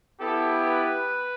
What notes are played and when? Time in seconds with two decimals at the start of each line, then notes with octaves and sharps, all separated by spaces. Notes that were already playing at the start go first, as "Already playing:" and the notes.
0.20 B3 E4 G4 A4
0.64 B4